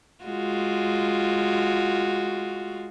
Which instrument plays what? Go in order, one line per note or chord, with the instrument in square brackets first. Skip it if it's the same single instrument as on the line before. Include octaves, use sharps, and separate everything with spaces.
[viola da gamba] G#3 F4 F#4